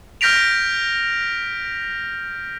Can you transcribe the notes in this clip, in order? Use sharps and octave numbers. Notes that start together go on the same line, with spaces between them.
F6 G6 A#6 B6 D7 F7